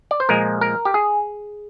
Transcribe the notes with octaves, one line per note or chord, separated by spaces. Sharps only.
D5
C5
A#2 F3 G#3 A#4
A#4
G4
G#4